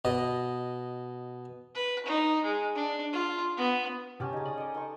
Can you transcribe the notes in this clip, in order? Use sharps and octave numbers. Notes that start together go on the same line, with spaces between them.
B2 D#5
B4
D#4
G#3
D4
F4
B3
A#2 C#3 C#4 G4 A5
D#4 G#4
C#4 D5 D#6
A4 D5 D#5
D#4 A5 C#6